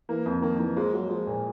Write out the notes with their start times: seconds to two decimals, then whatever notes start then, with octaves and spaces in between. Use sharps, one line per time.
0.09 E3 A#3
0.26 F2
0.42 D#3 A#3
0.59 E3 A#3
0.76 F3 G#3
0.93 F#3 G#3
1.09 F3 G#3
1.27 A#2